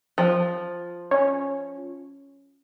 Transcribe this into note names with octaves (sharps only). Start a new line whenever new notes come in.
F3
C#4